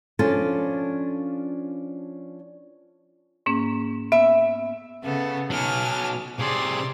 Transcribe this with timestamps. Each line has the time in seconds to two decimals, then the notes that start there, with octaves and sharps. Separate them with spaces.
0.19 F3 C#4 D4 F4 A4 A5
3.46 G#2 A#3 C#4
4.12 B3 E5
5.03 C#3 B3 A4
5.50 B2 F#3 G#5 A5 F6
6.39 C3 G#4 D5 C6